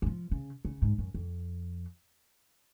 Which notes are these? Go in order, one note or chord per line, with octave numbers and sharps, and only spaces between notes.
F#3
F3
C#3
C#3
G#2
F#2
F2